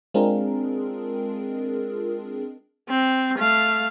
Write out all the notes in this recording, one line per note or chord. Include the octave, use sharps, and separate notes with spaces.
G#3 C4 D4 F4 G#4 A#4
C4
A3 F5